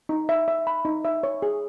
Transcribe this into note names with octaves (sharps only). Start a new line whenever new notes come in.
D#4
E5
E5
B5
D#4
E5
C#5
G#4